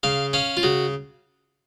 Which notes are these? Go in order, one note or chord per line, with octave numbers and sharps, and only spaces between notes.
C#3 F5
C#4 F5
F4
C#3 F#4